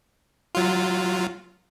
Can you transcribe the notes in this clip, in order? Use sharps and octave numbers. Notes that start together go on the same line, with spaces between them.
F#3 F4